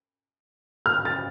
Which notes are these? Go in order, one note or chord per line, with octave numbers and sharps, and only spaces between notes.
F6
A6